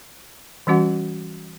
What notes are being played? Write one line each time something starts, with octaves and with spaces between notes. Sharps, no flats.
E3 G3 C#4 F#4 F#5